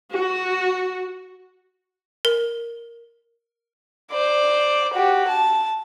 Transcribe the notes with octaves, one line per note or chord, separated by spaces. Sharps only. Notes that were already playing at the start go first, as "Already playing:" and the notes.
F#4
A#4
C5 D5
F#4 G4
A5